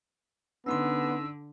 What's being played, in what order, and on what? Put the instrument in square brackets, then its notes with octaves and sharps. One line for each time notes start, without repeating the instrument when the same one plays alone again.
[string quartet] D3 [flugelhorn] B3 [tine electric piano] C#4 D#4 C6 [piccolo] E6